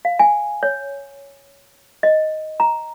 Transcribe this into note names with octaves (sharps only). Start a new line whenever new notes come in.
F5
G#5
C#5
D#5
A#5